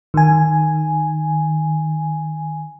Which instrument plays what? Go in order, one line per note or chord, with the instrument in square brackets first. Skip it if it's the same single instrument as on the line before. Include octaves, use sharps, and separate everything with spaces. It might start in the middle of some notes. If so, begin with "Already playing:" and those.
[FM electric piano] D#3 G#5